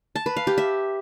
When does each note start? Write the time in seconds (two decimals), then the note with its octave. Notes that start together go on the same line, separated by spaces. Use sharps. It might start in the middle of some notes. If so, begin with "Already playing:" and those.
0.15 A5
0.26 B4
0.37 F5
0.47 G4
0.58 E5